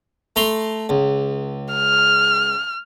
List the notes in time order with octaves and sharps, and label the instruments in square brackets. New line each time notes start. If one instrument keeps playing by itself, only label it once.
[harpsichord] A3 A#5 C6
C#2
[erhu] F6